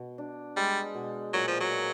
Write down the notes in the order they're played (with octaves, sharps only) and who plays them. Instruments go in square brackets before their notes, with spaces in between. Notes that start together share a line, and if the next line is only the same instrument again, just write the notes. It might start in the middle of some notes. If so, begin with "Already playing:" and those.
Already playing: [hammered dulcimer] B2
D4
[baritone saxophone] G3 [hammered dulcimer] G#3
[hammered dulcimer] B2
[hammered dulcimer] A#2 [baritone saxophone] F#3
[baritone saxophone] F3
F#3
[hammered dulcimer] F3